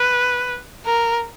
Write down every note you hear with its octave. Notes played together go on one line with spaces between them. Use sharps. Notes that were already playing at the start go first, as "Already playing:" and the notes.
Already playing: B4
A#4